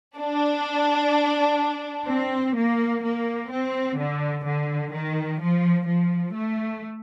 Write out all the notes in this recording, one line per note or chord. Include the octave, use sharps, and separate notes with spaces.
D4
C4
A#3
A#3
C4
D3
D3
D#3
F3
F3
A3